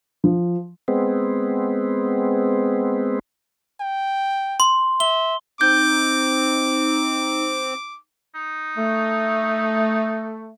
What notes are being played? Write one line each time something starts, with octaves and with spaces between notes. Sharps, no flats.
F3
G#3 B3 C4
G5
C6
E5 G7
C4 D#4 D6 G6
D#4
A3